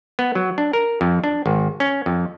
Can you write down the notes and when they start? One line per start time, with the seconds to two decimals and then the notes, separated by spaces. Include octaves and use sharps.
0.19 B3
0.35 F#3
0.58 D4
0.73 A#4
1.01 F2
1.24 D4
1.46 G#1
1.80 C#4
2.06 F2